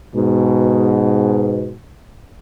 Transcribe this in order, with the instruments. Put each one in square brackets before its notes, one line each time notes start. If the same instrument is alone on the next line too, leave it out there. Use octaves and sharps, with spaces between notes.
[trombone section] G#2 B2